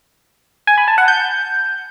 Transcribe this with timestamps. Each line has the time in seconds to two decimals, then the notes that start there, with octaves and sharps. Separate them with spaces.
0.67 G#5
0.78 B5
0.88 A5
0.98 F#5
1.08 G6